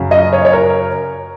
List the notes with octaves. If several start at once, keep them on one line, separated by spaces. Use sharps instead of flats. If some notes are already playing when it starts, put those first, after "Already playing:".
Already playing: F#2 C#3
D#5
C#5
C#5
A#4